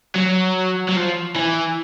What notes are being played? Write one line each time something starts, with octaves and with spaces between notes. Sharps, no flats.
F#3
F#3
F3
E3